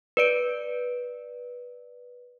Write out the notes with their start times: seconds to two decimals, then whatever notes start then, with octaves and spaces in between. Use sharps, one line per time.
0.17 B4 D5 D7